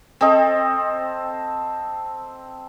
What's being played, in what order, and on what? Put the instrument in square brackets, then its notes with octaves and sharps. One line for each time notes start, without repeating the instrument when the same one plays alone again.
[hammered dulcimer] C4 A4 D#5